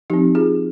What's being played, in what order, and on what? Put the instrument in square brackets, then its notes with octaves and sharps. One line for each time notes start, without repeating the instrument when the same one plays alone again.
[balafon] F3 D#4 G4
C4
F4 G#4